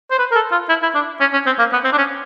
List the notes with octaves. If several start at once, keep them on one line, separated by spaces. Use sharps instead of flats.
C5
B4
A#4
A4
F4
E4
E4
D4
C#4
C#4
C4
A#3
B3
C4
D4
C#4